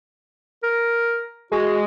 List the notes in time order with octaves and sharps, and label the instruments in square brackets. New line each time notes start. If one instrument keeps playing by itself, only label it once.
[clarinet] A#4
[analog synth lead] G#3 [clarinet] F#4